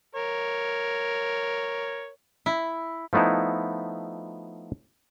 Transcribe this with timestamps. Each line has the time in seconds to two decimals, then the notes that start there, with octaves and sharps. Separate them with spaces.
0.15 A#4 C#5
2.46 E4
3.13 F3 A3 B3 D#4 E4